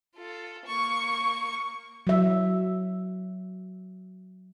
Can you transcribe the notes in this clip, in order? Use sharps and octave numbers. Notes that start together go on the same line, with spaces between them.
F4 A4
A#3 C#6
F#3 E5